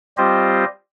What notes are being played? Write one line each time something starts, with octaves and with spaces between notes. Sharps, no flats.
G3 C4 F4 G4 C5 D#5